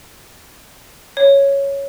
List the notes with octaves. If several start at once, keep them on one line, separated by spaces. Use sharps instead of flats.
C#5